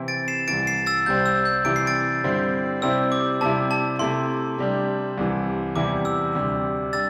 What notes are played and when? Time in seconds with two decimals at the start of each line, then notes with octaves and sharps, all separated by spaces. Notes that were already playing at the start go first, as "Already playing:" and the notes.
Already playing: C3 E3 C4 E4
0.08 A6 D7
0.28 C7 E7
0.48 C2 C3 E3 A6 D7
0.67 C7 E7
0.86 E6 A6
1.06 C2 C3 G3 C4 G6
1.26 E6
1.45 G6
1.65 C3 E3 G3 E4 D7
1.76 C7
1.87 A6 D7
2.24 G2 D3 G3 C4 E4
2.82 C3 G3 C4 E4 E6
3.12 D6
3.41 C3 G3 E4 A5
3.71 A5
3.99 C3 A3 E4 C6
4.58 C3 G3 D4
5.17 C2 C3 E3
5.76 E2 C3 G3 E4 D6
6.05 E6
6.35 D2 C3 G3
6.93 G3 D4 E6 A6